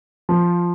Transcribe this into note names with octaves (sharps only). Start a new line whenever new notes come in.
F3